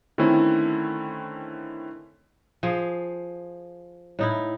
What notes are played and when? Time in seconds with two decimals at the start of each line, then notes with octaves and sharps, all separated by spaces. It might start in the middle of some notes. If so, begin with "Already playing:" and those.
0.18 D3 D#3 A3 C4 C#4 E4
2.63 F3 G#4 C5
4.19 A2 D#4 E4